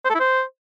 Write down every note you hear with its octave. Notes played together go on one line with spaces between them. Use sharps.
C5
A4
E4
C5